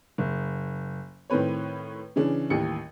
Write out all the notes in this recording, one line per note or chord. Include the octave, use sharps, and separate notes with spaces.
F#1
A2 D#3 C4 B4 C#5
C#3 E3 C#4 D4
A1 D#2 G3 C#7